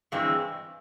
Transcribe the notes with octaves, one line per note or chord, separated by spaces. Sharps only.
G2 E3 G#3 C4